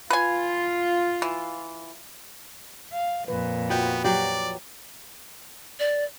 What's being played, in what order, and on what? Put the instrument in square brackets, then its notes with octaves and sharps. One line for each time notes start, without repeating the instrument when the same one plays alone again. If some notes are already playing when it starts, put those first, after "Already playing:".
[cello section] F4 [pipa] B4 G#5
[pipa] E3
[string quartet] F5
[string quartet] F2 A#2 [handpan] B4
[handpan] F3 F#4 [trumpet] B3 [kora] G5
[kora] F#3 G4 [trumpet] D5
[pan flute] D5